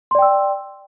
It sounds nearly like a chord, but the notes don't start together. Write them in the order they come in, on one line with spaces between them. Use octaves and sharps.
C6 D5 G5 E6